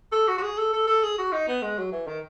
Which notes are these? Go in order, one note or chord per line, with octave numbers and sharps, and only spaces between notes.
A4
F#4
F#4
G#4
A4
A4
A4
G#4
F#4
D#4
B3
G#3
F#3
E3
D#3